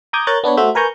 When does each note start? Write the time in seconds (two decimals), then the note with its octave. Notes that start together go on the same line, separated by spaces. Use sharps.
0.13 A#5 D6 D#6 G6 G#6 A#6
0.27 A#4 C#5 A#5 F#6 G6 A6
0.44 B3 D4 B4 C#5
0.57 A3 F#4 C5 E5
0.75 A#4 B4 G#5 A#5 C#6 G6